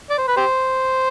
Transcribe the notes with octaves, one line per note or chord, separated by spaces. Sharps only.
D5
C5
B4
G4 C5